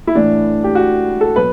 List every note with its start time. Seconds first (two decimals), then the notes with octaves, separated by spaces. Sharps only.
0.07 E4
0.15 A2 E3 A3 D4
0.64 G4
0.75 F#4
1.21 A4
1.36 B2 F#3 B4